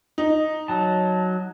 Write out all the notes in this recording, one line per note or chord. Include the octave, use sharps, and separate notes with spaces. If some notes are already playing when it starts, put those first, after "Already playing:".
D#4
F#3 A5